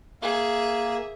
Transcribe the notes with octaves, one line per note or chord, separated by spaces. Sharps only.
A#3 G#4 E5